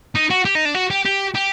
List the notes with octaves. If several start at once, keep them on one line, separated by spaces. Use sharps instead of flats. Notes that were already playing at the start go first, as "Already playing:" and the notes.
D#4
F#4
G4
D#4
D4
F#4
G4
G4
G4